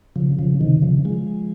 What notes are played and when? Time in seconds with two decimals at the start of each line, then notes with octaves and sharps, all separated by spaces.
0.16 C#3 F3
0.39 C#3 F3
0.61 C3 D#3
0.82 C#3 F3
1.05 F3 G#3